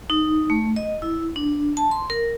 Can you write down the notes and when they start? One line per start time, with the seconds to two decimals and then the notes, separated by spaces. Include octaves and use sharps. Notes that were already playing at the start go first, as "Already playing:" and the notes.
0.10 D#4
0.50 A3
0.76 D#5
1.02 E4
1.36 D4
1.77 A5
1.91 C6
2.10 A#4